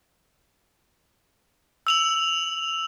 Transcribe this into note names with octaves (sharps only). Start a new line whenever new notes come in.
E6 F7 F#7